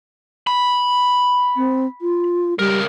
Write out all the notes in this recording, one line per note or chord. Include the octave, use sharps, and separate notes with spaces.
B5
C4
F4
C#2 G3 A#4